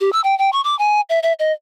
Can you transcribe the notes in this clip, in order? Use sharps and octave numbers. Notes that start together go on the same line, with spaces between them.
G4
E6
G5
G5
C#6
D6
G#5
E5
E5
D#5